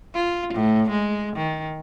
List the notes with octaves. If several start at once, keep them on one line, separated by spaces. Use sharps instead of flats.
F4
A2
G#3
D#3